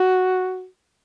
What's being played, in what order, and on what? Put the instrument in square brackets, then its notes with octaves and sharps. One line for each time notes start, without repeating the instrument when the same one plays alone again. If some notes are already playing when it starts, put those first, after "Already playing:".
Already playing: [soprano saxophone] F#4